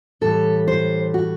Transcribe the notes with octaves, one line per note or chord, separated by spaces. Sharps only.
A2 E3 G3 A4
C5
F#4